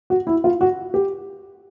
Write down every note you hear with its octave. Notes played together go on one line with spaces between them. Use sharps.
F#4
E4
F4
F#4
G4